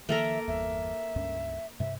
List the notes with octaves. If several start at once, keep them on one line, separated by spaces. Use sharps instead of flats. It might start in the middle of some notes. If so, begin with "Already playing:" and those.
D#3 F3 A#3 A4 A#4 E5
G1 E2 E5
C#2 G2 C#4
G2 C3 E5